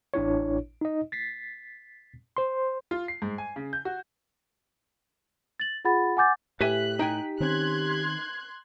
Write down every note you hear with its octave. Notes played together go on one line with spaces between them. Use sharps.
A1 D4 E4 C#5
D#4 D#5
A6 B6 C7
C5 C6
F4
C7
G#2
G#5
C#3
G6
F#4
A6 F#7
F4 G#4 F#5 B5 A6
F#5 G#5 D6 G6 A6
A2 G4 B4 E5 G#5 F#6 B6
D#4 G5 G#5
D#3 C4 C#4 C6 F#6 G#6